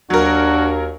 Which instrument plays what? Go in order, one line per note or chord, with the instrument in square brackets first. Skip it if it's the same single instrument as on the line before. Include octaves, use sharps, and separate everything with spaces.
[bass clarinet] D#2 [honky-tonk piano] F#3 A#4 [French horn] D4 [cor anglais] F#4